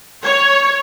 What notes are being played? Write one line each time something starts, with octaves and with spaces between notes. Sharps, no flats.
C#5